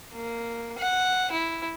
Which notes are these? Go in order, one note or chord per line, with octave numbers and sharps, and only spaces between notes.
A#3
F#5
E4